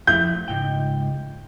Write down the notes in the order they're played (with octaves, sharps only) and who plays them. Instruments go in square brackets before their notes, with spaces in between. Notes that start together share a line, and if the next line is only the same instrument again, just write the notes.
[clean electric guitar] F3 A3 E4 [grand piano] G6
[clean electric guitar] C#2 G#2 G5